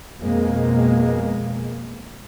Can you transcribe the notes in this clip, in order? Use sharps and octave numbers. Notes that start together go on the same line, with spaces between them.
F2 B2 G#3 A#3